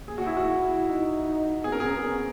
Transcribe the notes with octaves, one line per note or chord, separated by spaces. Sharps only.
A#3 G#4
F#4
E4
F#4
E4
E4
D#4
B3 G#4
C#4 A#4
B3 G#4
C#4
B3
C#4
B3